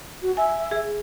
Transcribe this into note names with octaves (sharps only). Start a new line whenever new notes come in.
F#4
E5 G#5
G#4